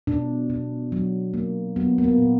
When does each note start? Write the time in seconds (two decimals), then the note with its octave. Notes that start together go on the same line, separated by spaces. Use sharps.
0.07 B2 D4
0.50 B2
0.92 F#3
1.34 A#3
1.76 F#3 B3
1.98 A#3
2.04 B3
2.18 A#2